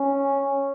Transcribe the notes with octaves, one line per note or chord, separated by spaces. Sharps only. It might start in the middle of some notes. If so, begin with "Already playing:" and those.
Already playing: C#4